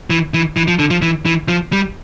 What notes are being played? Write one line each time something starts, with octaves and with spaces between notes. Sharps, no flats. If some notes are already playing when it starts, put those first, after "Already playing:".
E3
E3
E3
F3
D3
F3
E3
E3
F3
G3